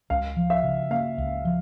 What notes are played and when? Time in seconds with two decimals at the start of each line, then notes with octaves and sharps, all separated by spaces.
0.10 C#2 F5
0.37 F3
0.50 E5
0.64 C#3
0.90 A#3 F5
1.18 C#2
1.45 F3